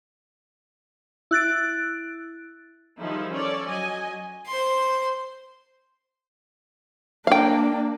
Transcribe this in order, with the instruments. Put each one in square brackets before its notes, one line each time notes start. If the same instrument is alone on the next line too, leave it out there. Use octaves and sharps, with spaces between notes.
[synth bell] E4 F#6 A6 D7
[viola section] D#3 F3 G3 D#4 E4 G#4
C#4 A4 C#5 D5
F#3 D#5 G#5
[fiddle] C5 C6
[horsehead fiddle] A#3 D4 [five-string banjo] F5 G5